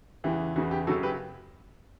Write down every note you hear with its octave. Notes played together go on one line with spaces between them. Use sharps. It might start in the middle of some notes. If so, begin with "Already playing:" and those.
E2 C#3 E3 G4
E2 C#3 E3 F#4
G4
F#2 C#3 F#3 F#4 A4
G4 B4